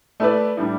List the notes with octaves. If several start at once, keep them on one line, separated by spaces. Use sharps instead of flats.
A3 E4 B4 D5
A2 G3 D4